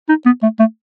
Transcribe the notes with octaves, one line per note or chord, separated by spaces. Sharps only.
D#4
B3
A3
A3